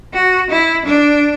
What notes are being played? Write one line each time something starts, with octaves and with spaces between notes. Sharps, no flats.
F#4
E4
D4